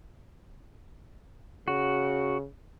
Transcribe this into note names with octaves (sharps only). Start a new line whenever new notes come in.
C#3 F#4